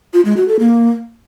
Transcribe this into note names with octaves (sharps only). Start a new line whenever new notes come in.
F4
G#3
F#4
A4
A#3